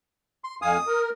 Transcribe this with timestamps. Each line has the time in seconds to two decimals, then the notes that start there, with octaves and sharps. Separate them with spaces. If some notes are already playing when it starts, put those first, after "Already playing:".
0.44 C6
0.62 F2 F5 G#5 D#6
0.87 A#4